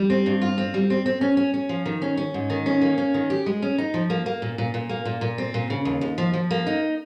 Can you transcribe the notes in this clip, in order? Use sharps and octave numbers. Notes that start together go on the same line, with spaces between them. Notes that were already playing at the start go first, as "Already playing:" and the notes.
Already playing: G3
C4
G2
F4
C4
G3
C4
C4
C#4
C#4
C#4
F3
D#3
C#4
C#4
G#2
D#3
C#4
A#3
C#4
D#3
G4
G#3
C#4
D#4
F3
A#3
A#3
A#2
A#2
A#2
A#3
A#2
A#2
C4
A#2
C#3
D#2
D#2
F3
F3
A#3
D#4